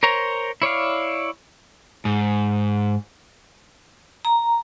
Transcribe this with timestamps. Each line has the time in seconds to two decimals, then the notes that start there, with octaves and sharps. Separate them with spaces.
0.03 A#4 C5 C#5 A#5
0.62 E4 C#5 D5 F5
2.05 G#2
4.25 A#5